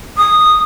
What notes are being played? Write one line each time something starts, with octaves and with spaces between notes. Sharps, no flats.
D#6